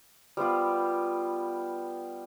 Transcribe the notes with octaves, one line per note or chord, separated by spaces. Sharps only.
G3 B3 F4 G4